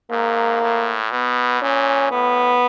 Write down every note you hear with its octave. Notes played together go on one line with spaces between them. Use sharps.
G#2 A#3
A2
B2 B3
A#2 C#4
A2 B3